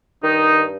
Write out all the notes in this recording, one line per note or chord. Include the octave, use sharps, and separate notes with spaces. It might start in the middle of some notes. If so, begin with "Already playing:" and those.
G2 D#3 D#4